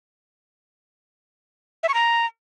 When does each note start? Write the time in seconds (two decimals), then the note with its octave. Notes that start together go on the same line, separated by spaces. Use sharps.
1.83 E5
1.89 C#6
1.94 A#5